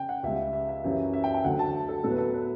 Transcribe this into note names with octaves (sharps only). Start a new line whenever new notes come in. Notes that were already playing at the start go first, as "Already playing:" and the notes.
Already playing: C#3 G5
F#5
C#2 C#3 G3 E5
E5
E5
F#2 E3 G3 C#4
E5
G5
G5
D2 D3 F#3 F#5
A5
A4
A2 F#3 B3 A4
B4
A4
B4